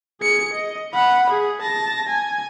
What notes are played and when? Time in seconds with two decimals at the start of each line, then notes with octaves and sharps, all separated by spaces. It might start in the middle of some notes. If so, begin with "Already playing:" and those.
0.21 G#4 C#7
0.54 D#5
0.93 F#5 B5
1.30 G#4
1.62 A5 A#6
2.09 G#5